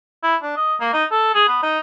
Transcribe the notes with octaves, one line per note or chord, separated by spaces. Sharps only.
E4
D4
D#5
A#3
D#4
A4
G#4
B3
D#4